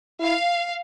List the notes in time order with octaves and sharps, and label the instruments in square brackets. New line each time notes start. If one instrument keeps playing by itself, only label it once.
[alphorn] E4 [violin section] F5